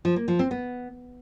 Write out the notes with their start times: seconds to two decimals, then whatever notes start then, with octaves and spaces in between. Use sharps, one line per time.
0.05 F3
0.16 A#3
0.28 F3
0.39 C4
0.51 B3